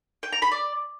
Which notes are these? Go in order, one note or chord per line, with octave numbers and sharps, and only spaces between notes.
G5
A#5
B5
D5